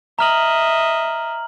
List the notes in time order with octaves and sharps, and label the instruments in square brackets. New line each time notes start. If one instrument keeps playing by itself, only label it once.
[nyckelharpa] D#5 E5 [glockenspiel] A#5 F6 F#7